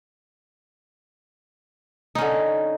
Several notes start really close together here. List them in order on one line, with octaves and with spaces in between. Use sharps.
D#4 C#4 D3